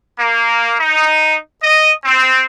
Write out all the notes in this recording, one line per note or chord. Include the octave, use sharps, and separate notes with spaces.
A#3
D#4
D#5
C4